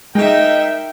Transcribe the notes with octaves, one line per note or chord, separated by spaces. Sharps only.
G#3 D#4 A#4 D#5 E5 G5